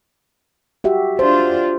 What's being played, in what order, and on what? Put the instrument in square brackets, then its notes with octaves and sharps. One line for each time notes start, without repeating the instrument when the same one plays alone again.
[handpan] F#4 G4 E5
[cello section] D4 F4 [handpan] C5